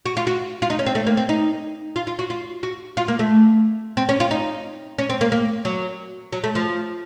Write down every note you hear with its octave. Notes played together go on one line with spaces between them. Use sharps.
F#4
F4
F#4
F4
D#4
C#4
C4
A3
A#3
C4
D#4
F4
F4
F#4
F4
F#4
F4
A#3
A3
C4
C#4
F4
D#4
C#4
C4
A#3
A#3
F#3
F#3
A3
F3